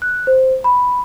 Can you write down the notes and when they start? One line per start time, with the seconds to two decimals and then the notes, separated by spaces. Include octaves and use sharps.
0.02 F#6
0.27 C5
0.64 B5